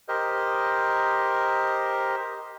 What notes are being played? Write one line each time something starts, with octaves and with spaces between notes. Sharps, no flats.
G4 A#4 C5 D#5